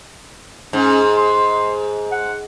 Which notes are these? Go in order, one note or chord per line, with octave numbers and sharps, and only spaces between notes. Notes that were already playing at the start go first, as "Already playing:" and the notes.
G#2 C#4
C6
F#5